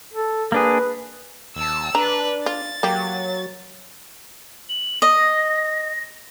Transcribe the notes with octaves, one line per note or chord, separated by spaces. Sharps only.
A4
A#3 D4 G#4 B4
D#2 A5 E6
D4 B4 A#5
F4 A6
F#3 A#3 G4
F#7
D#5 A#6